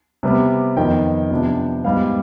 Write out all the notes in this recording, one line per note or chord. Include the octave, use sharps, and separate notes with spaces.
C3 G3 B3
F2 D#3 B3 G5
C3 F3 B3 D4
G#2 G3 B3 F5